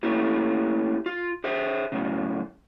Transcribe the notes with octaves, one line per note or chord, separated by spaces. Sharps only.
A3 A#3 C#4 E4 G4
F4
G#4 C5 E5
F#2 A2 C#3